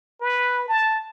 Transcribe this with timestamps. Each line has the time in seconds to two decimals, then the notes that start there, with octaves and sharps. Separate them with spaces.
0.21 B4
0.68 A5